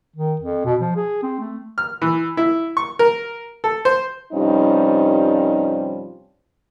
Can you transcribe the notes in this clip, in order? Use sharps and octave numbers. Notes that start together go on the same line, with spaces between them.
D#3
F2
B2
F3
G#4
C4
A3
F6
E3
E4
C#6
A#4
A4
C5
G2 C3 F3 G3 C#4 D#4